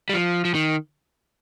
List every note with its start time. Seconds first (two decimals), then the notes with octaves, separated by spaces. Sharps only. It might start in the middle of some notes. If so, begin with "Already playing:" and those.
0.09 G3
0.13 F3
0.45 F3
0.55 D#3